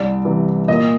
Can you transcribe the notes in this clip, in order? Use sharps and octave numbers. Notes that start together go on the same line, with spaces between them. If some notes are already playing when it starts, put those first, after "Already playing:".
Already playing: C2 D5
C3 E3
A#2 D#5